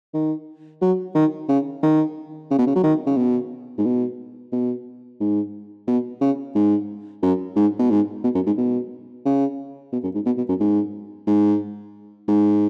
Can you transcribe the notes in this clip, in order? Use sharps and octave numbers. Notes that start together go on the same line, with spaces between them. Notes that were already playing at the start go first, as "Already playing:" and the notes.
D#3
F#3
D#3
C#3
D#3
C#3
B2
C#3
F#3
D#3
C#3
B2
G#2
B2
B2
G#2
B2
C#3
G#2
F#2
G#2
B2
G#2
B2
F#2
G#2
B2
C#3
B2
F#2
G#2
B2
B2
F#2
G#2
G#2
G#2